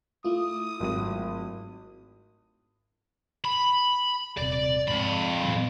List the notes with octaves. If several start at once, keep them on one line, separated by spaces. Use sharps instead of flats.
A3 E4 F4 D#6
G#1 F#3 D#7
B5
D#1 C3 D5
F2 G#2 B5
A#2 E3 F#3